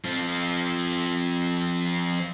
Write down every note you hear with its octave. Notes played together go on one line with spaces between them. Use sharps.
F3 C4